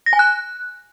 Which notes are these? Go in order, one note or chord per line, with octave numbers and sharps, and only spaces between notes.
A#6
G#5
F#6